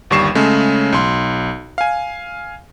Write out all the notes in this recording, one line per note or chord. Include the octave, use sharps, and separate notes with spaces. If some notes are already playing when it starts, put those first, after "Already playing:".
G1 D#2 G3 C#6 C7 E7
C#3 G#3 A3 C#4
B1 C6
F5 G#5